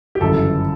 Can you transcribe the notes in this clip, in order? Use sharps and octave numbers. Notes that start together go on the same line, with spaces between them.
G4
G1 F#2 C#3 E3 A4